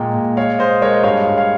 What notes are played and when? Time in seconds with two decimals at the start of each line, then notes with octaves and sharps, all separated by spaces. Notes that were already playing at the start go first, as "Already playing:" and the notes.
Already playing: A#2 G#3 G5 A#5
0.14 A#2
0.36 G#3 C#5 F5
0.59 G#3 C5 D#5
0.82 G#3 A#4 C#5
0.97 D#5
1.04 G2 C#5 F5
1.27 G2
1.37 C#5 F5